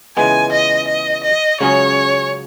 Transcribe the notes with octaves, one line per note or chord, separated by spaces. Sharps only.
C#2 C#3 E3 G#3 B3 G#5
D#5
D#5
D#5
C#2 C#3 F#3 C#4 G#4 C#5